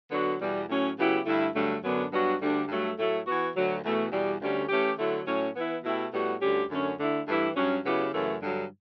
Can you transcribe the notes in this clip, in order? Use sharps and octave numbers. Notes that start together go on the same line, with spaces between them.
D3 F#3 B3 D4 F#4
E2 B2 G3
A2 F#3 C#4
C#3 F#3 B3 E4 G4
G2 D3 A3 E4
G2 D3 F#3 A3
F#2 D3 F#3 B3 D4
G2 F#3 B3 D4 F#4
D2 D3 G3 D4
G2 F#3 A3
A2 F#3 A3
E3 B3 F#4
D2 D3 F#3
E2 B2 A3
E2 B2 G3
D2 D3 G3 C#4 G4
E3 A3 C#4 G4
D3 F#3 A3 E4
A2 F#3 C#4
E3 B3 E4
B2 A3 E4 G4
A2 G3 B3 F#4
D2 D3 G3 C#4 G4
F#2 D3 A3 C#4
D3 A3 E4
G2 E3 A3 E4 G4
G2 F#3 C#4
C#3 F#3 B3 E4 G4
F#2 C#3 E3 A3
G2 D3 F#3